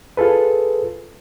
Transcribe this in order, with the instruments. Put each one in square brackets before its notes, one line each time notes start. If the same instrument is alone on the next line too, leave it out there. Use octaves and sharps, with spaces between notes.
[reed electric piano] F4 G#4 A4 B4